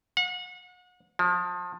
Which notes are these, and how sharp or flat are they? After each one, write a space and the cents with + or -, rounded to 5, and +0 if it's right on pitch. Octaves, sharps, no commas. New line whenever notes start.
F#5 -35
F3 +30